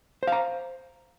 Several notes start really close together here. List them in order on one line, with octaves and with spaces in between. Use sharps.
C5 F5 A#5